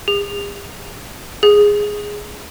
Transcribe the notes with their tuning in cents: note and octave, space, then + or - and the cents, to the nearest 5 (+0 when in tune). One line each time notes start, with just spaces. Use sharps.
G#4 -45
G#4 -5